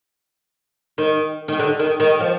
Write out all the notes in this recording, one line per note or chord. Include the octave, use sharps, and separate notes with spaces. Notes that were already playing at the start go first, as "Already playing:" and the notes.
D#3
D#3
D3
D#3
D#3
F3